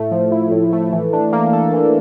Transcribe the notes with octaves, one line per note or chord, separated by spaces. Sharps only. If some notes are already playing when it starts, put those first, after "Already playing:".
Already playing: A2 A3
F3
E4
A2
A3
E3
D4
A#3
A4
E3